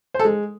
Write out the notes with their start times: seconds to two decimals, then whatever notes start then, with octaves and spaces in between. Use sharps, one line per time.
0.14 C5
0.19 A4
0.25 G#3